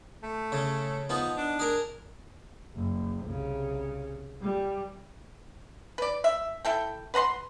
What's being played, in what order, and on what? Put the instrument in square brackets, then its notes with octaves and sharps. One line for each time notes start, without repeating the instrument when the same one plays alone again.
[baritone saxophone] A3
[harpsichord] C#3
[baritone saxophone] F3 [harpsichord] B3 D#4
[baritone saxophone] D4
[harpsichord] G#4 A#4
[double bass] F#1
C2 C#3
G3
[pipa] B4 D5
E5
E4 A4 G5
B4 F#5 A#5 C6